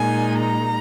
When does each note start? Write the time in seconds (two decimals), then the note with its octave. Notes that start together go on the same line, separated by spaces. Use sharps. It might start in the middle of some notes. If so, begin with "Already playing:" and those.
Already playing: A#2 G#3 D#4 G#5
0.39 A#5